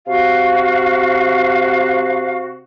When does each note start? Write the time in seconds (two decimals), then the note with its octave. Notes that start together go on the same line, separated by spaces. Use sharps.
0.07 C3 F#4 F5